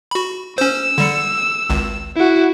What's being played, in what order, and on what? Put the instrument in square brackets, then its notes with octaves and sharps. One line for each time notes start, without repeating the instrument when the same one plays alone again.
[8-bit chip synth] F#4 B5
[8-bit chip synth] C#4 C5 [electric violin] E6
[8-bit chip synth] D3 G3 C#7
G#1 C#2
[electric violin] E4 F#4